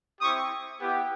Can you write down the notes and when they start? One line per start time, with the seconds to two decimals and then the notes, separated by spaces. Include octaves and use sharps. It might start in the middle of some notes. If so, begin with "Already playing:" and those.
0.21 C4 E4 G4 C#6 D#6
0.80 B3 E4 G4